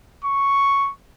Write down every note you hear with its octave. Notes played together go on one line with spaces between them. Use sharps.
C#6